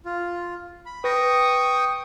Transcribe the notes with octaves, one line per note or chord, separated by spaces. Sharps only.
F4
B5
B4 G5 C#6 D#6 A#6